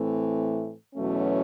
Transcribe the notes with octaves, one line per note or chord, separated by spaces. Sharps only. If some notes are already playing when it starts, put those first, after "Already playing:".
Already playing: A2 E3 A3 C4
E2 B2 F#3 A3 C#4